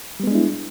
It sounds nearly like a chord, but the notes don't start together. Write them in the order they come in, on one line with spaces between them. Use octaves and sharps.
G3 B3 G#3 D4 E4